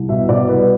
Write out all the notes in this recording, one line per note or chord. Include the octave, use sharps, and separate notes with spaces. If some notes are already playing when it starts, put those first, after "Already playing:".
Already playing: C2
B2 E5
B2 D5
C2 B4